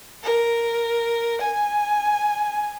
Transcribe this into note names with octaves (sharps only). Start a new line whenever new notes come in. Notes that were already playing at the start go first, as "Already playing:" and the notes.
A#4
G#5